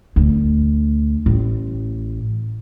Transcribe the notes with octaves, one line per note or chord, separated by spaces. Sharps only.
D2
A1